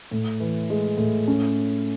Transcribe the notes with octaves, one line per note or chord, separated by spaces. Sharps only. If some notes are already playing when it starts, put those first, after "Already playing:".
A2
E3
G#3
A2
C#4